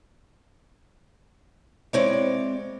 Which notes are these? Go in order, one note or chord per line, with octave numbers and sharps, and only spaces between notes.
G#3 C4 E4 C#5 D5